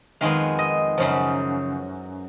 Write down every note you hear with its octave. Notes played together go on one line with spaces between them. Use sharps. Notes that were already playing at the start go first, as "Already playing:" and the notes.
F2 D#3 G#3 B3 F5
D#5
F#2 C#3 F3